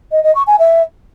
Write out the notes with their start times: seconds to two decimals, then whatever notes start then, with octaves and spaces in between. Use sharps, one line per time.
0.11 D#5
0.23 D#5
0.35 C#6
0.47 G#5
0.59 E5